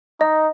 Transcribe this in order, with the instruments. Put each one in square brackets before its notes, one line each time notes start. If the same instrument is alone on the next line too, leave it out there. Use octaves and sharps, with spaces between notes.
[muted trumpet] D#4 [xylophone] D#5